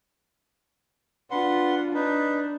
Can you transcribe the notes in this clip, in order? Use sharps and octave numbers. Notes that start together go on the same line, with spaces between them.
D4 F4 B4 F#5 C6
D4 D#4 B4